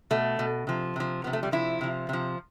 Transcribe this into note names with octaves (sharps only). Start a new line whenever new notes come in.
B2 A3
B2
C3 F3
C3 F3
C3 F3 B3
A3
G3
C3 F3 E4
C3 F3
C3 F3